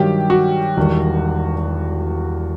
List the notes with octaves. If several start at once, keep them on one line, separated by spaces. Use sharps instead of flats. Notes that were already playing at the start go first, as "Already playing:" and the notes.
Already playing: G2 D#3 F#3 G4
F#4
E1 E2 D#3 G3